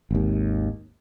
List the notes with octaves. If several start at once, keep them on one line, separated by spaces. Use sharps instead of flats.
G#1 D#2